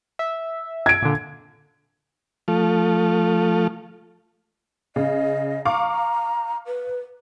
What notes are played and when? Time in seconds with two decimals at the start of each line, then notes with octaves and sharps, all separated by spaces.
0.19 E5
0.86 G#6 D7
1.02 A#2 D3
2.48 F3 A3
4.96 C#3 D#5
5.65 F5 A#5 C#6 D6
6.66 B4